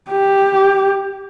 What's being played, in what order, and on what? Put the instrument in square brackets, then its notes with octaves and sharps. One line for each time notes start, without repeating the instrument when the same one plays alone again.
[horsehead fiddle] G4